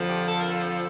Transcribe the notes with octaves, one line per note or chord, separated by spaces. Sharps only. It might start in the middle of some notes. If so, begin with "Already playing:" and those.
Already playing: F2 D3 F3
G4
A4
A#4
A4